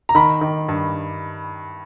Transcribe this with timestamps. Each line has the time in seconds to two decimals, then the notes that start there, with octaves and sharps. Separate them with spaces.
0.09 A#5
0.15 D#3 B5
0.41 D#3
0.68 G2